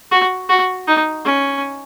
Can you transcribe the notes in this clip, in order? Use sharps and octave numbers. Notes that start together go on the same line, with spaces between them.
F#4
F#4
D#4
C#4